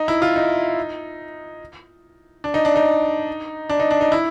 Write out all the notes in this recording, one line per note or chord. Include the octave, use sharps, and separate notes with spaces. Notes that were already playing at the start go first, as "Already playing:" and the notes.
Already playing: D#4
E4
F4
D#4
D4
D#4
D4
D#4
D4
D#4
D4
D#4
E4